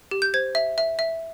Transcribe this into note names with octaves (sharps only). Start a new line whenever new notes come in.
G4
G6
C5 G#6
E5
E5
E5